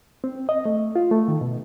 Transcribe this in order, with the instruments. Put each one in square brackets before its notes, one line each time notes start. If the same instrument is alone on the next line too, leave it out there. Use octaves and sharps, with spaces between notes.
[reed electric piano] C4
D#5
A3
F4
A3
D#3
B2